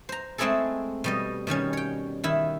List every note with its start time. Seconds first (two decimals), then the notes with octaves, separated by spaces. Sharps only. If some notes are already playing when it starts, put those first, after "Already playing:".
0.09 C5 A#5
0.38 G#3 A3 C4 E4 G#4 A4
1.04 B2 G3 D#5
1.47 B2 D#3 G3 C#4
1.73 C#5 G5
2.24 D#3 E4